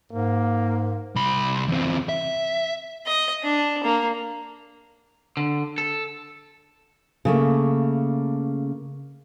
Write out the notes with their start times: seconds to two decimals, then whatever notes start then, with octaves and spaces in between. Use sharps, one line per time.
0.12 G#2 A#3
1.16 C2 B5
1.68 E2 C4
2.09 E5
3.06 D#5
3.43 D4
3.83 A#3
5.37 D3
5.78 A4
7.25 C#3 A3 A#3